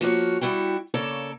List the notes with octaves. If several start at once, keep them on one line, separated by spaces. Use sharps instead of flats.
F3 A#3 F#4 C#5
G3 E4 F#4 G5
C#3 A#3 A4 C#5 D5 A5